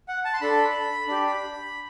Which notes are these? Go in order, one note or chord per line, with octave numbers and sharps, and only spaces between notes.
F#5
A5
C6
D4 A4 B5
D4 G4